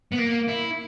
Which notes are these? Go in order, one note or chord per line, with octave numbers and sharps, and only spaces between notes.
B3
A#3
E4